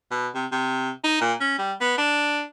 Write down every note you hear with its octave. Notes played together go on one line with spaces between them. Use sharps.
B2
C3
C3
D#4
A#2
C#4
G3
B3
D4